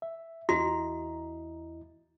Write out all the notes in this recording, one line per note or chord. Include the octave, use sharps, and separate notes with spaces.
E5
E2 E4 F#4 D#5 A#5